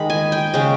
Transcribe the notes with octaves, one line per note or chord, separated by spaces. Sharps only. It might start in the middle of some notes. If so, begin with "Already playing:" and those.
Already playing: D#3 G#3 D#4 B5
G#5
G5
C#3 G#3 C#4 G5